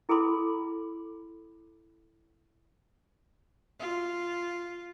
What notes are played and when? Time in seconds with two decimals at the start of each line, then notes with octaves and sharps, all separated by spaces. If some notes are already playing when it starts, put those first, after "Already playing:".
0.09 E4 G#4 A4 B5 C6 D6
3.80 F4